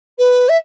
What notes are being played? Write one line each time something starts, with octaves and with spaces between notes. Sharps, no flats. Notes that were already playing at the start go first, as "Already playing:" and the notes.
B4
E5